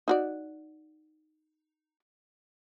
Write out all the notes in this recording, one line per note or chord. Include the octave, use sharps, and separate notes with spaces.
D#4 F#4 D5